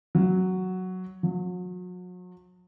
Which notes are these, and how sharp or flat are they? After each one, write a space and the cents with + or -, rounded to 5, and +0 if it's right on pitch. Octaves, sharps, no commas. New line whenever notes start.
F#3 +0
F#3 -40